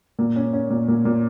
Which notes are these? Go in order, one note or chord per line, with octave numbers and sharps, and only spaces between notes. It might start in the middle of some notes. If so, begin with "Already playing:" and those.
A#2
C#4
C#4
A#2
A#2
A#2